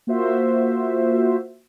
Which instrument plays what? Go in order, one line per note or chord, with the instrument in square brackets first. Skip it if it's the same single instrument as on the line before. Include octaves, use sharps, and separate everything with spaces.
[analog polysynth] A#3 F4 F#4 C5 E5